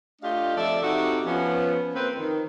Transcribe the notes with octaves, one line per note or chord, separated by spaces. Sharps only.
A3 D4 F4 G4 D#5 F5
F2 F3 A4 D5 E5
C3 D#4 E4 F#4 G4 A4
F3 B3 C#4
F2 A#3 C4 B4
D#3